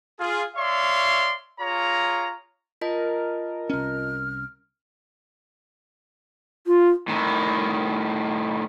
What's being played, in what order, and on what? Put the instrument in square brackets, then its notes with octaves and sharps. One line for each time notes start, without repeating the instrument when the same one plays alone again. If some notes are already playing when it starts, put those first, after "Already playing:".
[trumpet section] F4 G#4
C#5 D5 E5 F5 C6
F4 G#4 C#5 A#5
[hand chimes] F4 D#5 A5 [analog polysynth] A#4
[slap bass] C2 C#4 [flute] F6
[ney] F4
[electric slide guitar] A2 D#3